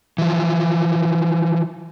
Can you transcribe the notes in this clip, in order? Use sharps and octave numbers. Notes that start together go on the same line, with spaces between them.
E3 F3